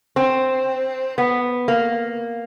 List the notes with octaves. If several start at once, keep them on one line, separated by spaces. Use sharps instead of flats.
C4
B3
A#3